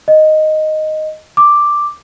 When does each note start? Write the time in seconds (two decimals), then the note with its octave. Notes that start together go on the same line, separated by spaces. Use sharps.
0.08 D#5
1.37 D6